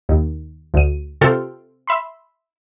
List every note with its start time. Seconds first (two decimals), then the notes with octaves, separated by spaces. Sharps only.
0.09 D#2
0.74 D2 D#7
1.21 C3 F4 A4 G5 C6 F6
1.87 E5 B5 C6